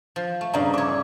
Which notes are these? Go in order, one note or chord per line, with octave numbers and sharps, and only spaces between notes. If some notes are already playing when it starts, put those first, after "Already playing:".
F3
A3
G2 C#3 D5 A#5
C#5 E5 D6
D6